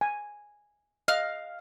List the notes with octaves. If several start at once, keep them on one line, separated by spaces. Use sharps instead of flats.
G#5
D#5 F5 F6 F#6